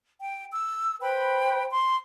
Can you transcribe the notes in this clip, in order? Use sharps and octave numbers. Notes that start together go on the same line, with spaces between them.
G5
E6
B4 C5 G5 B5
C6